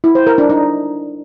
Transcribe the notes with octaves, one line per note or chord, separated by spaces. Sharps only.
E4
C5
A#4
D4
D#4